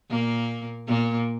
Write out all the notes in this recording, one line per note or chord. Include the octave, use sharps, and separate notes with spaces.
A#2 A#3
A#2 A#3